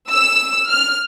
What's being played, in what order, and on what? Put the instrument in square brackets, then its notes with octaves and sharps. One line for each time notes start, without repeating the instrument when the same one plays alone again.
[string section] E6
F6